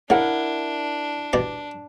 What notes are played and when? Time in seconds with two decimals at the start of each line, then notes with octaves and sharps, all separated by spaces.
0.10 C#3 D4 E4 A#4 F#5
1.33 B2 G3 G4